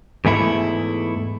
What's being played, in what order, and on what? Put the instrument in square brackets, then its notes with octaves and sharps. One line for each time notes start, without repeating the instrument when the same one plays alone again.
[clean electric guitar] E2 G#2 A3 E4